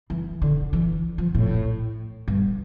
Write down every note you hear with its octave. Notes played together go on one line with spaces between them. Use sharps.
E3
D3
E3
F3
A2
G2